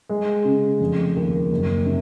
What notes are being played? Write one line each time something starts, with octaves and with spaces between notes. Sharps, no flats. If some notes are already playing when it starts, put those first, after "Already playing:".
G#3
C#3
F1
D#2
F#1
C3